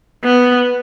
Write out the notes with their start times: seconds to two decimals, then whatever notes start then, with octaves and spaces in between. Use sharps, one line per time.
0.24 B3